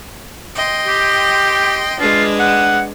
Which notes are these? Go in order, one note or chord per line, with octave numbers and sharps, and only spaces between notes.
D#5 G5 C6
G4
G#3 D4 F4 B4
F#5